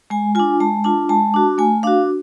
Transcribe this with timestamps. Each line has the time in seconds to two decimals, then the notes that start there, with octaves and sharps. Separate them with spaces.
0.10 G#3 G#5
0.35 D4 F4 G#5
0.60 G#3 A5
0.84 D4 F4 A5
1.09 G#3 A5
1.34 D4 F#4
1.58 A3 G#5
1.83 D4 F#4 F5